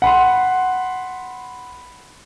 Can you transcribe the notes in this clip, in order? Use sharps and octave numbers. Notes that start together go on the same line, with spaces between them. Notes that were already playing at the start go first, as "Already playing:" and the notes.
F#5 B5 C6